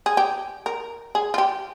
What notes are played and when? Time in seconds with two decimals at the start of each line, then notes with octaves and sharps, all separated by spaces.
0.06 G#4
0.17 G4
0.66 A#4
1.15 G#4
1.34 F4
1.38 G4